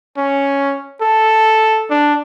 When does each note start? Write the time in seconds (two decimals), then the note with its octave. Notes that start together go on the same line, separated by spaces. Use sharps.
0.17 C#4
1.01 A4
1.90 D4